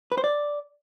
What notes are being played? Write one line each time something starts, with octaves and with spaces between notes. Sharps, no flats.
B4
C5
D5